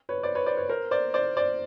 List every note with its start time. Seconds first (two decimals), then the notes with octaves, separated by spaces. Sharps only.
0.09 B4 C#5
0.23 C5 D5
0.35 B4 C#5
0.46 C5 D5
0.57 B4 C#5
0.69 A#4 C5
0.91 C5 D5
1.14 C5 D5
1.37 C5 D5